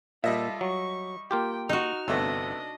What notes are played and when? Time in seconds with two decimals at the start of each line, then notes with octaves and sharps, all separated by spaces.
0.24 A#2 G3 F4 A4 D#5 E5
0.61 F#3 C#6
1.31 A#3 F4 G4 G5
1.69 D#4 F#4 F6
2.08 G1 C3 A3 B3 D4 D#5